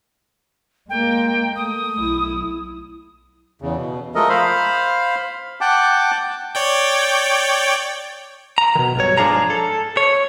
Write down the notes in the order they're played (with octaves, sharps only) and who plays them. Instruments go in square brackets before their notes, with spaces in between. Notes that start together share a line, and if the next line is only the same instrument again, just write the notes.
[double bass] G#3 A#3 [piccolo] G5
[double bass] A3 [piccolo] D#6
[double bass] B1 E4
[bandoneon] E2 C#3
B2
F3 G#3 A3 A4 A#4 D#5
C5 F5 B5
F#5 G5 A5 D6
[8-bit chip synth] C#5 D5 G5
[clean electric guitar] A#5
B2 D#3
B1 G2 C#5
G#2 F3 D4 F4 G#4 A#5
A4
C#5